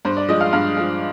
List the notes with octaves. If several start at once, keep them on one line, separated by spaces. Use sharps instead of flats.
G2 C5
D5
F3 G#3 D#5
F5
G2 F5
F3 G#3